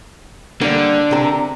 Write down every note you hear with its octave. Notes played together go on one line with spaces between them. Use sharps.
D3 G3 A#3
C3 A#4